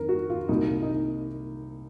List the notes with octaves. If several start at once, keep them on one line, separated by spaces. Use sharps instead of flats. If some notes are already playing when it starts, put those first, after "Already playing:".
Already playing: F2 D#3 A#4
F#4
F4
C2 A#2 D#4
D#4